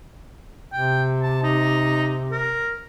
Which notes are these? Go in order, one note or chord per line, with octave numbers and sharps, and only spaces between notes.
C3 G5
A5
D#4
A#4